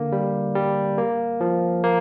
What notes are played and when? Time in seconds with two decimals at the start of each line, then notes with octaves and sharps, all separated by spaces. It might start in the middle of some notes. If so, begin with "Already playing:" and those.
Already playing: D3 A#3
0.12 G3
0.55 G3
0.98 A#3
1.41 F3
1.84 A#3